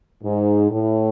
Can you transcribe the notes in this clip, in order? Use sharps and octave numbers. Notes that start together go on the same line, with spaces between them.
G#2
A2